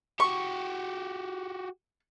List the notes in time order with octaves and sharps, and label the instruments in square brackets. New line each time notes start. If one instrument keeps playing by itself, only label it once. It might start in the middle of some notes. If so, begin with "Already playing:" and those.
[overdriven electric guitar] F#4 G4 [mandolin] C#6